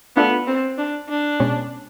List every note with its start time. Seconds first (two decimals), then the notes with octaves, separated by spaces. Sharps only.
0.16 A3 B3 D4 F4 A4
0.47 C4
0.78 D4
1.09 D4
1.40 B2 G#3 C#4